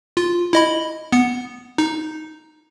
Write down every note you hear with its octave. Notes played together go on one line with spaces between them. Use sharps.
F4
E4 D#5 B5
B3 C#7
D#4